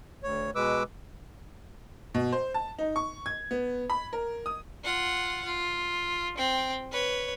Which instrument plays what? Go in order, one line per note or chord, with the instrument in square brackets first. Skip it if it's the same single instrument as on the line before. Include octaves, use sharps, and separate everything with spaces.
[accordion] D2 C#5
B2 G#3 B4 D6 E6
[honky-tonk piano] B2
C5
A5
D#4
C#6
G#6
B3
B5
A#4
D#6
[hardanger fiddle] F4 F#5
F4
C4 G5
B4 C#5